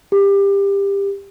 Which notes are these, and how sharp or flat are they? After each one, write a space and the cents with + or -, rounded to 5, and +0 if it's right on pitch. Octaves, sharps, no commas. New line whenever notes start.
G4 +20